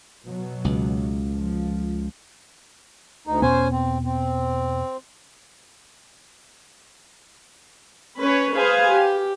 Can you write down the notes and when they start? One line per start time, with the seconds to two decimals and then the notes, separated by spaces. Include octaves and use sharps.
0.25 B2 F#3
0.65 C#2
1.34 F3
3.27 D2 D#4
3.42 E2 B2 B3 C#4 C5 G#5
3.72 C4
4.05 C4
8.19 C#4 B4 C#5
8.57 G#4 B4 C5 F5 G#5
8.90 G4